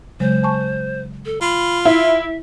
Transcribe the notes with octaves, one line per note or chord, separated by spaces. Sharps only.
C#3 F#3 G#3 C5
G#5 A5 C#6
A4
F4 B5
E4 E5